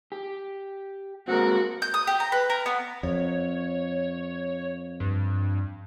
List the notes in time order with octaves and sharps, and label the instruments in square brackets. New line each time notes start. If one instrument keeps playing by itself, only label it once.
[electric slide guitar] G4
[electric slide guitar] G#3 A#3 C4 [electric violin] F#4 [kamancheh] A#4 F#5
[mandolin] G6
D#6
G4
A#5
B4
A#4
B3
[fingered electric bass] F2 [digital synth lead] C#5
[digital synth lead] G2